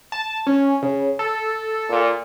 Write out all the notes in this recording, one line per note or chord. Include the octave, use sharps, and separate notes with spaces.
A5
C#4
C#3
A4
A#2